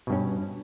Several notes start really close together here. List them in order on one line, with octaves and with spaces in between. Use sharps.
B2 G2 C#4